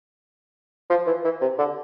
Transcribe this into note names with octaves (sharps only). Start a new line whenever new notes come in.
F3
E3
E3
C3
D3